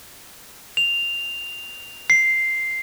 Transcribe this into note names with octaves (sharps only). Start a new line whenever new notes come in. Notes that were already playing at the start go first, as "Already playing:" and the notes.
F7
C7